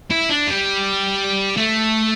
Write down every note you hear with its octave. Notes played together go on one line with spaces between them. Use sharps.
E4
D4
G3
A3